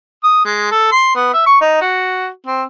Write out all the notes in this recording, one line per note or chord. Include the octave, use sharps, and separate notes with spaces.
D#6
G#3
A4
C6
B3
E5
C#6
D#4
F#4
C4